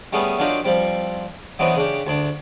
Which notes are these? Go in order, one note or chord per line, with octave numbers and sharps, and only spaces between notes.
G3 A3 B3 C#4 G#4
F#3 A#3 D4 D#4 F4 G4
F3 G3 C4
E3 F#3 B3 C4 D4 D#4
C#3 D4 G4
D2 D4